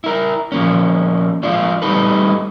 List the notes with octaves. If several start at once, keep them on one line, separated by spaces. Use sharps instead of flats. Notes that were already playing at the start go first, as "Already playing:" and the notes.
E4 A#4
F3 A#3 C#4
F3 G#3 D4 F4
G3 A3 C4 D#4 A4 B4